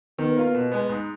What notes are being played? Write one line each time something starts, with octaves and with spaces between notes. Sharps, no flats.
D#3 B3
A#3 F4
B2
G#3 B3
G#2